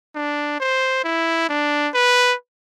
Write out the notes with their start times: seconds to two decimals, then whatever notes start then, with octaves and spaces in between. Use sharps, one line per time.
0.15 D4
0.60 C5
1.04 E4
1.49 D4
1.94 B4